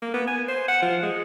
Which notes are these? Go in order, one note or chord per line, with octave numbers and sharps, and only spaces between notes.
A#3
B3
G#5
C5
F#5
F3
G#3